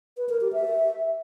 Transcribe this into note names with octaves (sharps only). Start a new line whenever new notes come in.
B4
A#4
G4
E5